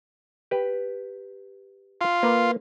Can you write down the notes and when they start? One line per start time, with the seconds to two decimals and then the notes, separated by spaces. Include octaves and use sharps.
0.51 G4 B4
2.01 F4
2.23 A#3 B4